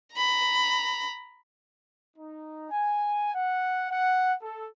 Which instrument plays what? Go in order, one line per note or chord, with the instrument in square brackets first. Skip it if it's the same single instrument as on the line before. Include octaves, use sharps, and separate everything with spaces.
[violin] A#5 B5
[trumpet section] D#4
G#5
F#5
F#5
A4